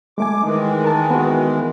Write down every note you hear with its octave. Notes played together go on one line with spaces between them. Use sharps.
G#3 A3 G#5 D6
D#3 E3 G#3 D#4
A#4 A5
B3 F#4